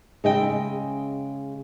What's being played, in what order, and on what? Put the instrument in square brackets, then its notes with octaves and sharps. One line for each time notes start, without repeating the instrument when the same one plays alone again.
[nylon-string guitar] C#3 G#3 D#5 E5 G5